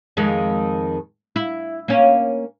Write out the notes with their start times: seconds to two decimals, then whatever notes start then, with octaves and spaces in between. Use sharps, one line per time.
0.17 F2 D#3 G#3
1.36 E4
1.88 A#3 C#4